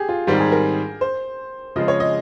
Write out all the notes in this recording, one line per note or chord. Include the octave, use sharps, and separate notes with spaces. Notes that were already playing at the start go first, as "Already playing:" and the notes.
Already playing: G4 G#4
F4
G#2 D#3 G3 C4 G4
G#4
A#4
C5
C#3 F3 G#3 C4 D#5
C#5
D#5